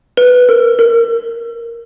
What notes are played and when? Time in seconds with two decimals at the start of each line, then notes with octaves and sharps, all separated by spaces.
0.17 B4
0.49 A#4
0.79 A#4